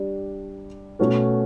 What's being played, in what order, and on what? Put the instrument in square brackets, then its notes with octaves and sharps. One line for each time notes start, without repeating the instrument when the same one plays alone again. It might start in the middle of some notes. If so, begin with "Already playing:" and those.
Already playing: [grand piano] G3 D4 G4 D5
B2 A3 C#4 F#4 A4